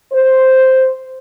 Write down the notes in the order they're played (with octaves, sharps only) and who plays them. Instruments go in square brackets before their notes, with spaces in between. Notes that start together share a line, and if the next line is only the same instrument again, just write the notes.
[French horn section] C5